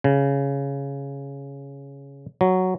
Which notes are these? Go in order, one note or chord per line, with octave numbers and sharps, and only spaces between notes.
C#3
F#3